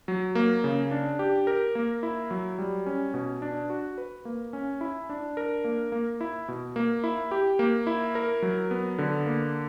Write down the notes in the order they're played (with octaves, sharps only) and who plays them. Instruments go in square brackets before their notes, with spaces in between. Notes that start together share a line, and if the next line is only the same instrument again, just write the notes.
[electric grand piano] F#3
A#3
C#3
D4
G4
A#4
A#3
E4
F#3
G3
C#4
B2
D4
F#4
B4
A#3
C#4
E4
D4
A#4
A#3
A#3
E4
B2
A#3
E4
G4
A#3
E4
A#4
F#3
B3
D3
A#3